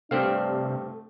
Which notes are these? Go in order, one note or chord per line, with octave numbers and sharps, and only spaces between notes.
G2 C3 A3 C4 D4 F5